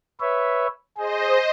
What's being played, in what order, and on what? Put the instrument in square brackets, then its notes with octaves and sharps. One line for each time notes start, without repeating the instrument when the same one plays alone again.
[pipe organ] B4 C#5 E5
[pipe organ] G#4 [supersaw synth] C5 D#5